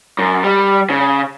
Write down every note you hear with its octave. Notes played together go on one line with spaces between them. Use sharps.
F#2
G3
C#3